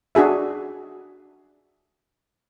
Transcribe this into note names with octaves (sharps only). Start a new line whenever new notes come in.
D4 F#4 G#4 E5